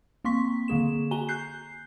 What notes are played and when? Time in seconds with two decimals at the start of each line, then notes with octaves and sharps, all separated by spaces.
0.25 A#3 C4 C6 C#6 B6
0.68 D3 A#3 G#4 E7
1.11 F#4 G#5 A#5 G7
1.29 F#6 G6 C7